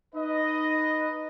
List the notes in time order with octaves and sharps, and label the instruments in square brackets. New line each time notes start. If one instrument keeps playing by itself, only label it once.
[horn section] D#4 B4 D#5